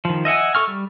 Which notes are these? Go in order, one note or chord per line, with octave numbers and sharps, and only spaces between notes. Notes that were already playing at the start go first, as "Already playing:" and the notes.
D#3 F3
D#5 E5 F#5 G#5
A4 C#6 F6
G3